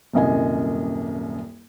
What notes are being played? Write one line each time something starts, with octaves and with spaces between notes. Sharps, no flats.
D#1 C2 F#2 D#5 G#5